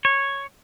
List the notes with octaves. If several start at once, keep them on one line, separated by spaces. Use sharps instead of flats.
C#5